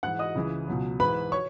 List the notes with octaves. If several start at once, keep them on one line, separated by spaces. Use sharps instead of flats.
G#2 E3 F#5 F#6
D#5 D#6
C#2 C#3 E3
C#2 B2 F#3
G#2 E3 B4 B5
C#5 C#6